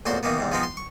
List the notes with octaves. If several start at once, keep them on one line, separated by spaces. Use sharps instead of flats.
A1 E2 A#2 F#4 C5 C6
B2 D#3 E3 A#3 B3
E2 G#2 C3
F3 G#3 B3 C4 D#4 F4
C6
C#6